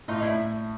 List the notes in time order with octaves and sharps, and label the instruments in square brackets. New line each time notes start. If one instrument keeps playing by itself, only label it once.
[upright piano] A2 [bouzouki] D#4 F4
[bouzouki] D4 E4
[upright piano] A2